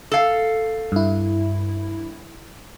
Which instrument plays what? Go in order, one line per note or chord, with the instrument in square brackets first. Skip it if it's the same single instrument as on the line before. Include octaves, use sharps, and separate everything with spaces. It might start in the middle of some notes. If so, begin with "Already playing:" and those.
[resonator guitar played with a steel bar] A4 F5
[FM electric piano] G2 E4